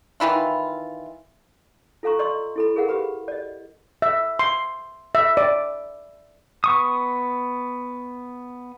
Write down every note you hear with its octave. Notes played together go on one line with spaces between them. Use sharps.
D#3 E3 E4 F4
F4 A4 F5 A#5 C#6
D5 D#5 C6 C#6 E6
E4 A4 B5
G#4 A#4 F5 F#5
G4 B4 B5
D5 D#5
E5
C6
E5
D5
B3 C#6 D#6